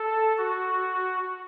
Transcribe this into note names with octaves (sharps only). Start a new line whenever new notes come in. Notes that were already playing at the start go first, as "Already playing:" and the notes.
Already playing: A4
F#4